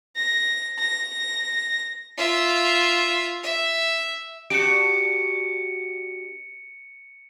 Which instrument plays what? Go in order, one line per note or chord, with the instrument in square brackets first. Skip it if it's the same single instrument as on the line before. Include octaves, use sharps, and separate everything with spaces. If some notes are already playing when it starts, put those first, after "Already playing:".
[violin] A#6
A#6
[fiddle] F4 E5
E5
[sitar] D4 F#4 G4 [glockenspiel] C#7 D7